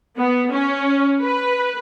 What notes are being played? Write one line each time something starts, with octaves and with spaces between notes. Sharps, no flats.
B3
C#4
B4